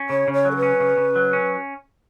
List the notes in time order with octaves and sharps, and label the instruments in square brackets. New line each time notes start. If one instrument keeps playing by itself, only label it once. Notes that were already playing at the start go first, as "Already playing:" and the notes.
Already playing: [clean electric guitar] C#4
[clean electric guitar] C#3 [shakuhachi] C#5
[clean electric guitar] C#3
[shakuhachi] C#5
[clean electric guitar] F#3
[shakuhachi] A4
B4
[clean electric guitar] C#4
C#3
C#3
F#3
C#4